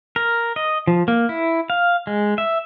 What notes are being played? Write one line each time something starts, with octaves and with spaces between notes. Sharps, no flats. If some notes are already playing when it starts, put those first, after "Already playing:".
A#4
D#5
F3
A#3
E4
F5
G#3
E5